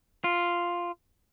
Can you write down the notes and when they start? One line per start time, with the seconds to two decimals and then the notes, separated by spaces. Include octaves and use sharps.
0.24 F4